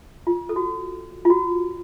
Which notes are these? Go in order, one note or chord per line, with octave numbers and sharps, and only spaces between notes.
F4
A4
F#4
F4
F#4